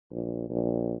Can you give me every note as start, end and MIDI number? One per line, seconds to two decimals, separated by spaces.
0.12 0.45 34
0.50 0.94 34